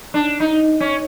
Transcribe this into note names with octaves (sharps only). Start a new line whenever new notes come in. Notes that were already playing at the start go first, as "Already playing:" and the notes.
D4
D#4
C#4